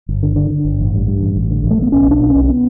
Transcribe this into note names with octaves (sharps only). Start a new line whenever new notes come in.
G1
D3
D3
D3
G1
A1
G2
G2
A1
A1
D3
A1
A3
A1 B3
B1 C#4
B2 D4
B1
C#4
B1
C#4
B3